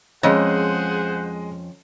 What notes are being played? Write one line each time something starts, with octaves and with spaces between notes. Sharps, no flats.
F2 G#3 C#4 G#4 C5 D#5 F#5